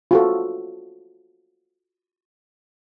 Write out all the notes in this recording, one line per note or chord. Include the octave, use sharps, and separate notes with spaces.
F4 F#4 A4